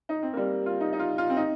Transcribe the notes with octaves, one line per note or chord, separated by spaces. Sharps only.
D#4
C4
A#3
G3
F4
D#4
D#4
F4
F4
C4
D#4